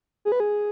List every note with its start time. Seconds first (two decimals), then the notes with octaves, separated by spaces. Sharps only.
0.25 G#4
0.32 B4
0.40 G#4